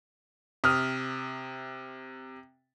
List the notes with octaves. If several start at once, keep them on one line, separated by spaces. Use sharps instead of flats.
C3 D#6 F6